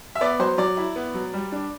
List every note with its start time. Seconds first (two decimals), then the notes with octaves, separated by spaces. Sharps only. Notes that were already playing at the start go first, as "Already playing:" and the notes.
0.15 E5
0.21 B3 D5
0.39 F#3 C5
0.58 F#3 D5
0.77 E4
0.96 B3
1.14 F#3
1.33 G3
1.52 D4